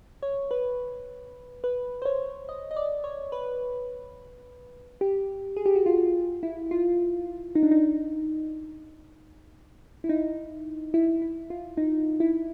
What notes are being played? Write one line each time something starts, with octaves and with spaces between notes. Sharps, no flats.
C#5
B4
B4
C5
C#5
D#5
D#5
D5
C#5
B4
G4
G#4
G4
F#4
F4
E4
F4
D#4
D4
D#4
E4
D#4
E4
E4
F4
D#4
E4